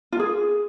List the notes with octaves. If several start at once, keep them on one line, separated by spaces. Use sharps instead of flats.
F4
G#4